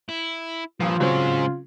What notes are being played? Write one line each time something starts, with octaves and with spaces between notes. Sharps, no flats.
E4
G2 A#2 F3 F4
C#3 F#3 G#3 C4 C#4 C5